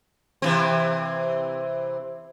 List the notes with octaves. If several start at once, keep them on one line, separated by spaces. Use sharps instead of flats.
C3 E3 C4